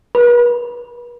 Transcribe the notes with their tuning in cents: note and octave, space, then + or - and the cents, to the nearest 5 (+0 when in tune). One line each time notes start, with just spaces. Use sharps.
B4 -40